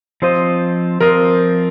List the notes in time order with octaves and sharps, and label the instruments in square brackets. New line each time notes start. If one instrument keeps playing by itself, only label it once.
[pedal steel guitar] F3 C4 F4 D#5 [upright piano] C5
[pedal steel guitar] F3 C4 F4 D#5 [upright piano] A#4